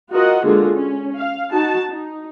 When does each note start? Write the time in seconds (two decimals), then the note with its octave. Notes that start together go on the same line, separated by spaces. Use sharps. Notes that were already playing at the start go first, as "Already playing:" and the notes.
0.11 F4 F#4 A#4 D#5 F#5
0.44 D3 G#3 A#3 F4 F#4 G#4
0.76 C#4
1.17 F5
1.52 D#4 F#4 A5
1.90 D#4